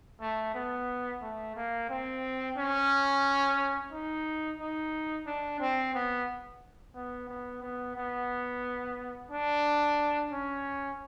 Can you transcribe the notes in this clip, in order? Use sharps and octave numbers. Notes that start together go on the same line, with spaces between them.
A3
B3
A3
A#3
C4
C#4
D#4
D#4
D4
C4
B3
B3
B3
B3
B3
D4
C#4